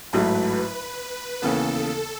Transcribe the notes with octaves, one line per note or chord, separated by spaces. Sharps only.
A1 G#2 F#3 A3 B4
D#2 C#3 E3 B3 A4
A4